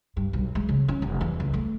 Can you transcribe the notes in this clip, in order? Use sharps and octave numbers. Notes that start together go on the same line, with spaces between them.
G2
B1
G#3
C#3
C#4
F1
E2
C#2
A3